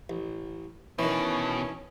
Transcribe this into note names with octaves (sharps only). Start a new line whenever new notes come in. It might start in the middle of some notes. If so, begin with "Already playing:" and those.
A1
B2 D#3 E3 C#4